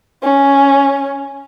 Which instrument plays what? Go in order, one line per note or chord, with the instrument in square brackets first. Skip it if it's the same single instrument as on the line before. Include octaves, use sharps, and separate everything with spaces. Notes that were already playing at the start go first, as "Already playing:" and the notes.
[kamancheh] C#4